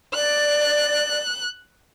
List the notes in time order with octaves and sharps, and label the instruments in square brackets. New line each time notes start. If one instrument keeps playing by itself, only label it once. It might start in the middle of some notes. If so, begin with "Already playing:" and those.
[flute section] D5 [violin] F#6